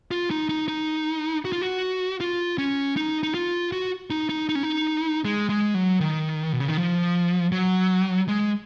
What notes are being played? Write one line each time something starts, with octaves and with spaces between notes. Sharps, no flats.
F4
D#4
D#4
D#4
F#4
F4
F#4
F4
C#4
D#4
D#4
F4
F#4
D#4
D#4
D#4
C#4
D#4
G#3
G#3
F#3
D#3
B2
C#3
D#3
F3
F#3
G#3